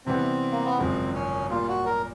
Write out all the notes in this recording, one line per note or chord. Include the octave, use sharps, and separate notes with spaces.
C3 E3 G3 B3 C4
A#3
B3
G#1 F#2 C#3 F3 G#3 C4
C#4
A#2 G3 A#3 F4
F#4
A#4